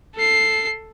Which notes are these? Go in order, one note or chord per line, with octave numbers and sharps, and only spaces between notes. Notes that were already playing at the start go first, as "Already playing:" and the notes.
A4 C7